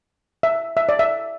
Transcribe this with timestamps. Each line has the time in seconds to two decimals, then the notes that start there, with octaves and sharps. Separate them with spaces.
0.43 E5
0.77 E5
0.89 D5
0.99 E5